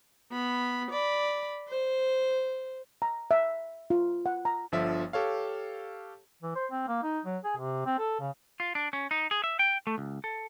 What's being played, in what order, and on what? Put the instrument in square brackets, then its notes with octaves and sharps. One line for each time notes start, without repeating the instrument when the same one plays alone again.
[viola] B3 B5
D5 B5
C5
[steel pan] A#5
E5
F4
F#5
A#5
[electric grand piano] G1 D3 F3 E5
G4 A4 C#5 F5
[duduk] E3
C5
C4
A#3
D#4
F#3
G#4
C3
C4
A4
C#3
[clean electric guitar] F4
D4
C#4
D#4
G#4
E5
G5
A3
C#2
A4